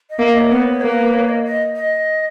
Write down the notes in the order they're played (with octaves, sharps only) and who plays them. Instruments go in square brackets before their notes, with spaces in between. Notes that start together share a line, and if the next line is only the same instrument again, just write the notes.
[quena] D#5
[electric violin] A#3 [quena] E5
[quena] D#5
C#5
[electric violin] B3 [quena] B4
[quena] C#5
[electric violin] A#3 [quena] B4
[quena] C#5
D#5
D#5
D#5